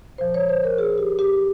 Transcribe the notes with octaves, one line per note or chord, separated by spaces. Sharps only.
A#2 F3 C5
C#5
C5
A#4
G#4
G4
G4